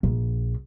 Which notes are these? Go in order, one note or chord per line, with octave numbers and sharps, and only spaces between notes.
A#1